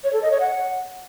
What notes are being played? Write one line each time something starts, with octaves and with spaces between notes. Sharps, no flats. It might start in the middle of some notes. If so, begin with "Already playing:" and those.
C#5
A4
D#5
C#5
F#5